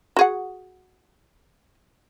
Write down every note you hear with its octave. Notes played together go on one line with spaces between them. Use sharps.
F#4 G#4 F#5